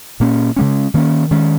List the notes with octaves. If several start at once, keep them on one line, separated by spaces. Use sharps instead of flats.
A#2 A#3 C#4
C#3 G#3 C#4
D#3 A#3 C#4
D#3 G#3 C#4